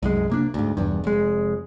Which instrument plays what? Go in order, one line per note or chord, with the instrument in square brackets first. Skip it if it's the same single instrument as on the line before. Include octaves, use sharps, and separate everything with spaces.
[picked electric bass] C2 F#2 G#3
C3 A#3 D4
D2 G#2
E1 E2 G2
F1 G#3